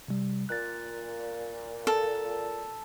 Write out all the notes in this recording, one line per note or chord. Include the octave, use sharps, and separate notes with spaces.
C3 G3
A#2 F#6 A6
A4